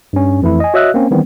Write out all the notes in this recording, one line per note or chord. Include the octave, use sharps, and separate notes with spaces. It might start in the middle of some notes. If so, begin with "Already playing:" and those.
G2 C#4
F2 E3 A3 E4
D#5 G#5
F#4 C#5 D#5 E5 E6 F#6
A#3 C4 C#4
D#3 E3 G3 B3 C4